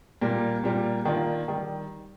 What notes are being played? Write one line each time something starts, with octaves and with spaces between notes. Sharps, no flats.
A#2 G3 A#3
A#2 G3 A#3
D#3 A#3 D4 F4
D#3 G3